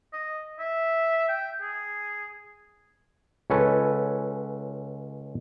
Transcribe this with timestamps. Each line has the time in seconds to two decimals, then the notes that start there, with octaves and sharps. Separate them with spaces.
0.13 D#5
0.59 E5
1.28 G5
1.62 G#4
3.50 C#2 C#4 A4 B4